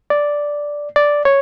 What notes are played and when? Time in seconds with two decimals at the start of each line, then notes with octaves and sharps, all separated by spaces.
0.10 D5
0.96 D5
1.25 C#5